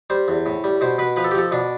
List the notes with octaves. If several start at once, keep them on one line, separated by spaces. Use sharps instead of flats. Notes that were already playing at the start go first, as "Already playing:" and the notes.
G3 C5
E2
A2
G3
B2 C5
B2 B4
F3 B4
A4
G4
F3 A4
B2 D4